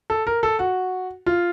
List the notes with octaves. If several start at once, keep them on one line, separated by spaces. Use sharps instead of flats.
A4
A#4
A4
F#4
F4